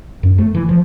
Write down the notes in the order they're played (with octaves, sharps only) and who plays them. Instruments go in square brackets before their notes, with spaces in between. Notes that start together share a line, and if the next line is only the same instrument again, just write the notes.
[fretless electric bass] F#2
A3
E3
F3